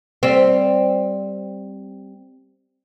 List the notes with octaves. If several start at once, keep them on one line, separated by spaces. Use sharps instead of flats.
G3 C4